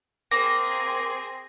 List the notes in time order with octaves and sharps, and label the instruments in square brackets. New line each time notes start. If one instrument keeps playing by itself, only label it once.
[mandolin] A#3 [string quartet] C4 G#4 [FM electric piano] A#6